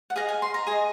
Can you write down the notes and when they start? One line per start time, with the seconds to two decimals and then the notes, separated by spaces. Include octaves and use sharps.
0.10 F#5
0.16 G#4 D#5 F5
0.29 G#5
0.42 C6
0.54 A#5
0.67 G#4 D#5 G#5